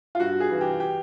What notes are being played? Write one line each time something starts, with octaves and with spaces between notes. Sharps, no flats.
F4
G2 F#4
G#4
E3
G4
G4